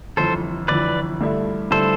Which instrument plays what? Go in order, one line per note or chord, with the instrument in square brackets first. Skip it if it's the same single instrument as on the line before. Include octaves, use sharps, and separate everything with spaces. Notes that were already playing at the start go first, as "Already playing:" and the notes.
[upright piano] G1 F2 E3 [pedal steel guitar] A4 C5
[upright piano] G1 F2 E3 [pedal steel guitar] B4 D5
[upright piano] G2 D3 A3 E4
[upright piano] G2 D3 A3 E4 [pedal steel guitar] A4 C5